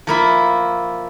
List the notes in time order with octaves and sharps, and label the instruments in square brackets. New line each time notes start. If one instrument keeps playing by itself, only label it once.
[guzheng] F3 A#3 E4